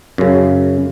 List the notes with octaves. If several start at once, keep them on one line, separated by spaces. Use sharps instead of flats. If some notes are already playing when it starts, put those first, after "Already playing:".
F#2 C#3